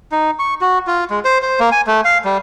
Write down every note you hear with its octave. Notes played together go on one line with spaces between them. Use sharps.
D#4
C#6
F#4
F4
G#3
C5
C5
A#3
G#5
A3
F5
G3